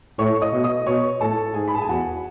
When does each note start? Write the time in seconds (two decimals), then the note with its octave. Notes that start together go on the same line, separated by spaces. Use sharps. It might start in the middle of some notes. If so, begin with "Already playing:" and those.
0.19 A2 C#5 C#6
0.41 D#5 D#6
0.53 B2
0.64 D#5 D#6
0.87 B2 C#5 C#6
1.21 A2 A4 A5
1.54 G#2 G#4 G#5
1.68 B5
1.75 A5
1.82 G#5
1.89 E2 F#4 F#5